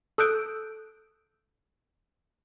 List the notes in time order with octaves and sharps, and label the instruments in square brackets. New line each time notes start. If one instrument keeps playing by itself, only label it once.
[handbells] A4 D#6 E6 F#6 G6 D7